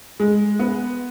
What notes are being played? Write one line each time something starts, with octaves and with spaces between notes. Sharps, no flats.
G#3
B3